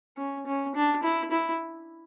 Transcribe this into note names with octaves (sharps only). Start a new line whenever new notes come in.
C#4
C#4
D4
E4
E4